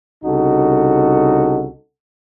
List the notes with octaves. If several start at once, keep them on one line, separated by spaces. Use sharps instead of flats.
C2 C#3 D#4 F#4 A4